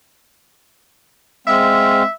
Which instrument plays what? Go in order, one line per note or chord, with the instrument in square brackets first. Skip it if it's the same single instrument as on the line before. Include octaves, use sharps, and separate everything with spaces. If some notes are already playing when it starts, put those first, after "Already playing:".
[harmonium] G#3 C4 F5 [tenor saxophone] E5